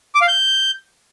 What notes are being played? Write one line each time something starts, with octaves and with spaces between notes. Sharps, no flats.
D6
F5
G6